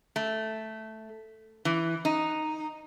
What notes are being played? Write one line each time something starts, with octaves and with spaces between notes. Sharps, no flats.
A3
E3
D#4